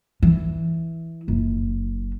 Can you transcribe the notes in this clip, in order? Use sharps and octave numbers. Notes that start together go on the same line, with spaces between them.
E3
F#1